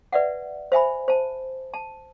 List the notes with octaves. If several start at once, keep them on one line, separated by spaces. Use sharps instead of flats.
B4 D5 E5 F#5
C5 E5 G#5 B5
C5 A5
A5